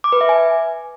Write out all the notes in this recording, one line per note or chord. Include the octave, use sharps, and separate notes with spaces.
D6
B4
E5
G#5